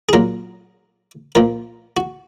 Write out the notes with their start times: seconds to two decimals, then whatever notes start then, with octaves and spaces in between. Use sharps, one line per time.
0.09 G#4
0.13 A#2 F#3 A#4
1.35 A#2 F3 A#4
1.97 F#4